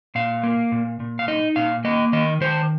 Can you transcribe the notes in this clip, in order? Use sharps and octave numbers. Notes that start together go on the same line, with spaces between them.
A#2 F5
A#3
A#2
A#2
F5
D#4 D#5
A#2 F5
A#3 D#5
D#3 D#5
D#3 C5